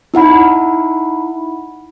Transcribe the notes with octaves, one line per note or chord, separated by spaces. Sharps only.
D#4 E4 F#5 B5